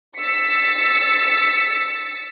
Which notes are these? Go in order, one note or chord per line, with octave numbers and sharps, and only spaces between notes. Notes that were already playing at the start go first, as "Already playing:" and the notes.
E6 A6 B6 C#7